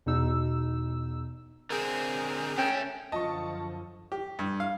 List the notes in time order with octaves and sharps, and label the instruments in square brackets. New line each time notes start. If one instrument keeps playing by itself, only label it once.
[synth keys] E2 B2 D#4 E6
[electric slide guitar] D3 C4 [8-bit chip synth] G#4 A#4
[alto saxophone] C#4 [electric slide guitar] F#4 A4 E5 [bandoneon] G5
[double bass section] F#2 D3 F3 [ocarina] F4 [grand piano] D#5 [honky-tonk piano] A5 C#6
[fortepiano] G4
G2
F5